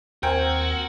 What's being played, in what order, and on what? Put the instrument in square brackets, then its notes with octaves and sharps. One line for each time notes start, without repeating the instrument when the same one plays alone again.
[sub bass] D#2 [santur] C4 C5 [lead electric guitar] F#4 [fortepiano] A#4 G5 G#5